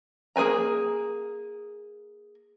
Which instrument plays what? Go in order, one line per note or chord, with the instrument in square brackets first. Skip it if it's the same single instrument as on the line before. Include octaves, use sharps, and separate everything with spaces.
[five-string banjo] A#3 G#4 B4 G#5 A#5